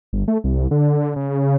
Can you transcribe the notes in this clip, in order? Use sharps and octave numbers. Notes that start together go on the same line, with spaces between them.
G1
A3
C2
D3
C#3